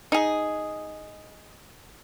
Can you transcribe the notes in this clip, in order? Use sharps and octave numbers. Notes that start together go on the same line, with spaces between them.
D#4 G#4